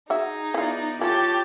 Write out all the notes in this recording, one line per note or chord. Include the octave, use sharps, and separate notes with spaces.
D#4 F#4 G#4 E5
B3 E4 F4 D5
E3 A3 F4 G4 C#5 A5